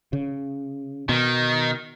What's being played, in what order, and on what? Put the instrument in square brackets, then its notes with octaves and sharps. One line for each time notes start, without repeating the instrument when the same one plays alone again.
[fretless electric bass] C#3
[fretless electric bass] B2 [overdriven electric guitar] D#3